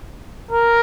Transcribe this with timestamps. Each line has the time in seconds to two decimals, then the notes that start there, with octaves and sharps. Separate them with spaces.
0.51 A#4